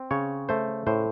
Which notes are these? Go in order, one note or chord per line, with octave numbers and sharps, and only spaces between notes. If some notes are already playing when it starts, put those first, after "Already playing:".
Already playing: C4
C#3 C#5
A3 C5
A2 C5